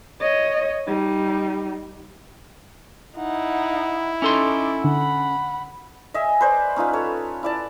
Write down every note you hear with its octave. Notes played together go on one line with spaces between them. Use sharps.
C#5 D#5
G3 D#4
D#4 E4 F#5
C#4 D#4 A4 C6 D6
D3 F#5 B5
D#5 E5 G#5
B4 C5 D5
C#4 D#4 F4 B4
A4 C#5
E4 D5 A5